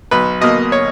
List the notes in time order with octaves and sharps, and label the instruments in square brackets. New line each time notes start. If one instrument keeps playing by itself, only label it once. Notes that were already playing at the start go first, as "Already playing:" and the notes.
[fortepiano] B1 B4
B2 A#3 D#5
C#5